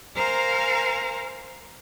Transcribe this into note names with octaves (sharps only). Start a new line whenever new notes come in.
A#4 C5 F5 G#5 A#5